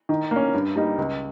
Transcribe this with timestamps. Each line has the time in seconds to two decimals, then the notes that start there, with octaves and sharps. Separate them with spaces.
0.09 D#3
0.31 A#3 C#4
0.54 G2
0.76 G3 A#3 D#4
0.98 C#2